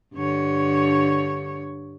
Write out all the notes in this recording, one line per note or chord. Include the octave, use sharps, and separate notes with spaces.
G2 D3 C#5